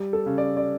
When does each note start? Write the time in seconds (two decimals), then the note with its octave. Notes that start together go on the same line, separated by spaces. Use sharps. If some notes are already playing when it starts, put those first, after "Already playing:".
Already playing: G3
0.13 A4
0.26 C#3
0.38 D5
0.57 D5